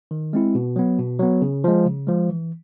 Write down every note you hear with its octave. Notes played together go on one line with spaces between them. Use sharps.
D#3
G#3 C4 E4
B2
F#3 B3
B2
F#3 B3
C#3
F3 G#3
C#3
F3 G#3
E3